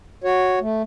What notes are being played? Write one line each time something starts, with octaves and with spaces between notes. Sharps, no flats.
F#4 C#5
A3